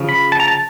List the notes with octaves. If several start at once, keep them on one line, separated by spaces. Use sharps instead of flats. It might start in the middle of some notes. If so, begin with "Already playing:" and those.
Already playing: C#3 F3
B5
A5
A#5
A5